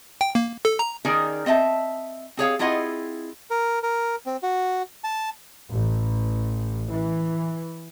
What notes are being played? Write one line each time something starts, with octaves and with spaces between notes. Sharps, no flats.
G5
A#3
A4
A#5
D#3 C#4 D#4 G#4 A#4 D5
C4 D#5 E5 A5
C4 G#4 C#5 F5
C4 E4 F4 G#4 D#5 F#5
A#4
A#4
C4
F#4
A5
A1
E3